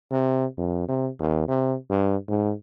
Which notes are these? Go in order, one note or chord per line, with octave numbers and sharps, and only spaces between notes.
C3
F2
C3
D#2
C3
G2
G#2